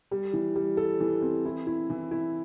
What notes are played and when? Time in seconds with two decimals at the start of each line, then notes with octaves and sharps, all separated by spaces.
0.11 G3
0.33 E3
0.56 G3
0.77 A4
1.00 E3
1.22 C4
1.45 E4
1.67 E4
1.90 E3
2.11 E4